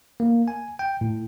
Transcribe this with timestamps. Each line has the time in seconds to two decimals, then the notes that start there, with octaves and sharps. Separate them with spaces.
0.20 A#3
0.48 G#5
0.79 G5
1.01 A2